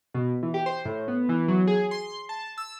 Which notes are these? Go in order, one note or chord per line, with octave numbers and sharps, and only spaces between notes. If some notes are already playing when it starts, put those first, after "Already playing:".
B2
E3
G4
C5
A2
B3
E3
F#3
G#4
C6
A5
E6